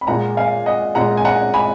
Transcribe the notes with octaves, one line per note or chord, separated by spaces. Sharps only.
B5
A#2 G#3 F#5 A#5
F5 G#5
D#5 F#5
A#2 G#3 F#5 A#5
G#5
F#5 A#5
G#5 B5